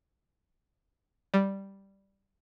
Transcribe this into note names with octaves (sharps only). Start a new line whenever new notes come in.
G3